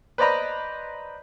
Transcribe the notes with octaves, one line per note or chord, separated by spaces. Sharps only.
B4 C5 D5 D#5 A#5 B5